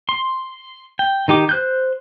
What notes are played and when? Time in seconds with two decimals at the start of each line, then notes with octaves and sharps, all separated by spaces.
0.09 C6
0.99 G5
1.28 D#3 D#4 G4 D6
1.49 C5 F#6 G6